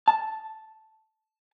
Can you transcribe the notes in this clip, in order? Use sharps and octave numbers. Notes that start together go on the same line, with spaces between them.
A5